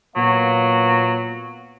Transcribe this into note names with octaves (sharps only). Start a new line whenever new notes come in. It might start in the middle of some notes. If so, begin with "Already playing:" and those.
A#2 F#3 B3 F5